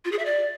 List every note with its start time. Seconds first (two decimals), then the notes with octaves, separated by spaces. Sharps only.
0.05 F4
0.12 G#4
0.19 E5
0.26 D5